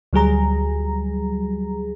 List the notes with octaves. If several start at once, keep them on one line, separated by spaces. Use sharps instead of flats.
D2 F#3 G3 G#4 A#5